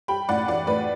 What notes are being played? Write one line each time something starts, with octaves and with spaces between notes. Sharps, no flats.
G3 G5 B5
A2 D5 F#5
E3 D5 F#5
A2 B4 D5